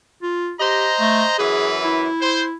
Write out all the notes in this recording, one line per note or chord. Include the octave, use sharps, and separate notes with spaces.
F4
G4 C5 D#5 A#5
A3
F#2 E3 G#4 B4
E4
C5